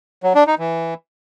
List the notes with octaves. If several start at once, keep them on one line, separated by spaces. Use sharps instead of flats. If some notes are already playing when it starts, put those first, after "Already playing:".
F#3
D4
D#4
E3